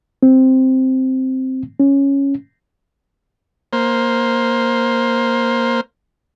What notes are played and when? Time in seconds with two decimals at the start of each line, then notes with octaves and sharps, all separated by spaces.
0.23 C4
1.80 C#4
3.73 A#3 C5